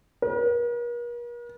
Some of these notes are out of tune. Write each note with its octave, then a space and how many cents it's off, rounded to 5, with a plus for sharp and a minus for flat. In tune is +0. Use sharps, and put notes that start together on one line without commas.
A#4 +45